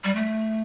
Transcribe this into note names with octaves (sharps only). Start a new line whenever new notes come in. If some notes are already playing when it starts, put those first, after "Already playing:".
G3
A3